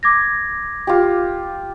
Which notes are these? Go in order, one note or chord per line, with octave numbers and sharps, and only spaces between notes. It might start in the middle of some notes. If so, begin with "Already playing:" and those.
D6 G#6 A#6
F4 G4